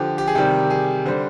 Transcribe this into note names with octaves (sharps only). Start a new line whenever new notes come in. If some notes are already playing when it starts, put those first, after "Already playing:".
Already playing: D3 F3 G4
G4
G#4
C3 D#3 G3 G4
G#4
D3 G3 C5